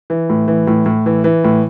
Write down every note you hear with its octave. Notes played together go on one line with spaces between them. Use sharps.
E3
A2
E3
A2
A2
E3
E3
A2